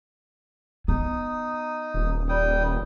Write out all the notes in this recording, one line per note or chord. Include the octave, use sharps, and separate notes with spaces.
B3 D#4 D#6
D#1
G3 G5 D#6